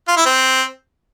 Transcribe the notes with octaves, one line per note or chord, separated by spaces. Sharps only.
F4
E4
C4